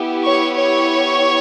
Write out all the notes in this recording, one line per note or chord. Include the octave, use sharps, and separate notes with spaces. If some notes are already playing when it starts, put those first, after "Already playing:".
Already playing: B3 E4 G4
C#5 C#6
C#5 C#6